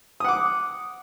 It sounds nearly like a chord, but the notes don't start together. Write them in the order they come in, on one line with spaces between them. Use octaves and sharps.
D#6 F#5 D6